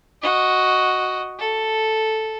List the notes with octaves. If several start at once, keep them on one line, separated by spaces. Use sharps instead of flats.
F#4 D#5
A4